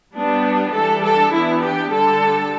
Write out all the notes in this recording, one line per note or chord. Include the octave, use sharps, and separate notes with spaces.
G3 B3 D4
E3 G3 D4 A4
A4
E3 B3 D4 E4
G4
D3 G3 D4 A4